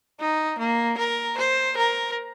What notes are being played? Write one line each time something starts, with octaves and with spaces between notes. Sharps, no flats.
D#4
A#3
A#4
C5
A#4